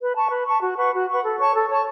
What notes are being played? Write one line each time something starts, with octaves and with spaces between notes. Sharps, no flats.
B4
A5 C#6
B4
A5 C#6
F#4
B4 F#5 C#6
F#4
B4 F#5 C#6
A4
C#5 A5 C#6
A4
C#5 A5 C#6